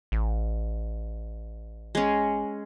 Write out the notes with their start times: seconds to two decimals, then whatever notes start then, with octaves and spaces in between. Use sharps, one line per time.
0.12 A1
1.95 G#3 C#4